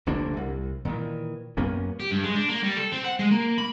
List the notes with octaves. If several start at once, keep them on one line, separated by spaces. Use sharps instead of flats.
F1 D2 A#3 D4
C2
A#2 D#3 E3
F#2 A#3 B3 C#4
G4
G2
G#3
D4
A#3
G3
A4
C4
F#5
G#3
A#3
B5